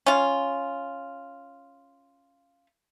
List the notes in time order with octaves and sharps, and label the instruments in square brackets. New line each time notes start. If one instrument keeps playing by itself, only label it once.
[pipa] C#4 F4